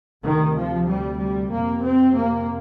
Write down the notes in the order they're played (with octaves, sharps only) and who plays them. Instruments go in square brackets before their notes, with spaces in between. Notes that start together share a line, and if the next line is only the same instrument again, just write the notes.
[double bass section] D2 C3 D#3
F3
G3
G3
F2 C3 A#3
C4
A#3